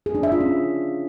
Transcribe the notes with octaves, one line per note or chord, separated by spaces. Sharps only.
G#4
D4
E5
F4
C#4